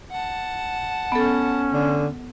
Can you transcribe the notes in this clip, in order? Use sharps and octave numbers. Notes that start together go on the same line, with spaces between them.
F#5 A5
B3 C#4 A4
D3